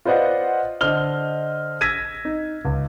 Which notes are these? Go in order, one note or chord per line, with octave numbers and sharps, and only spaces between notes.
F4 B4 C5 D5 D#5 F#5
D3 C5 D#5 F6 G7
E6 G#6 A#6 B6 D#7
D#4
C#2